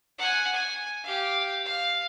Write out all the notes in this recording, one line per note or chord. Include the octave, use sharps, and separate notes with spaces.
F#5 G#5
G#5
G4 F5
F5